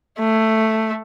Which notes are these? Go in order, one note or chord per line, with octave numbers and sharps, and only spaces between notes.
A3